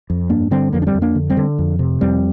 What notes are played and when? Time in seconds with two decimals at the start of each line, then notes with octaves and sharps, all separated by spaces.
0.10 F2
0.30 G2 A#3 D4
0.51 D3 G3 C4
0.73 F2 F3 A#3
0.82 D4
0.87 G3 C4
0.95 F2
1.02 A#3 D4
1.15 D3
1.30 G3 C4
1.37 D3
1.59 F2
1.79 C3
2.01 F2 G3 C4